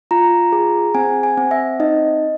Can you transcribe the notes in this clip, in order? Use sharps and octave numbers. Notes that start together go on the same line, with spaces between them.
F4 A#5
G#4
C4 G#5
G#5
C4
E5
D#4 D#5